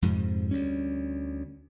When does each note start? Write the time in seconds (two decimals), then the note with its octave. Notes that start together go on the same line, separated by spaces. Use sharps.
0.02 F2 G#2 C3 F3
0.51 D2 G3 C#4